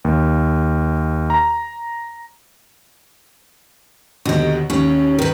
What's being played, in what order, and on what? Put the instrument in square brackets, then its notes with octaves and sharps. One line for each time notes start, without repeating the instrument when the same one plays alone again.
[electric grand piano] D#2
A#5
[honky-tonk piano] D#2 B2 D3 [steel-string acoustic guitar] G4 D#5
[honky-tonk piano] D#2 [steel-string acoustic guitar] C#4
[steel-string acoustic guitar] D#3 B4 [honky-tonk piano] A#4